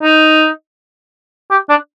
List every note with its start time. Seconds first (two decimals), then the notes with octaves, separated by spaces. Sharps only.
0.03 D#4
1.51 G4
1.69 D4